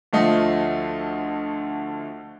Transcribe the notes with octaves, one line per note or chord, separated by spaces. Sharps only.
D2 F3 A3 D#5 F5